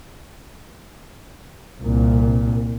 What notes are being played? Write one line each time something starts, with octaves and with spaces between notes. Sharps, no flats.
C2 A#2